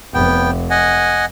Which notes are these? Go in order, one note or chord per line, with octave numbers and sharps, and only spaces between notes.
F1 B3 G5
D#5 F#5 G#5